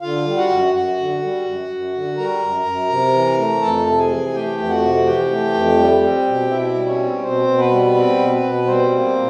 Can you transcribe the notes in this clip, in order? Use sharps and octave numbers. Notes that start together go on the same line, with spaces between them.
D3 F4 F5
G3
F#4 F#5
F#2
F#2 F#4 F#5
D3
G3
F#2
F#2
D3
G3 A#4 A#5
F#2
F#2
C3
E3
A3
F2 A4 A5
C3
G#4 G#5
E3
A3 G4 G5
F2
F#4 F#5
C3
E3 G4 G5
A3
F2
G3
C4
B2
B2 E4 E5
G3
C#4 C#5
C4
B2 C4 C5
B2
B3 B4
G3
C4
B2
B2
G3 C4 C5
A#3
A#2